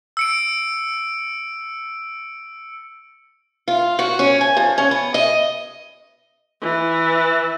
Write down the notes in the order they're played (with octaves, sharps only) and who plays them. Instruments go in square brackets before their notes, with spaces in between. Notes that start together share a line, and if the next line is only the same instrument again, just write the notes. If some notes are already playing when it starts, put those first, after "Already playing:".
[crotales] E6 C#7 D7
[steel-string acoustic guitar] F4
F#4
C#4
G#5
F3
C#4
B3
D#5
[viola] E3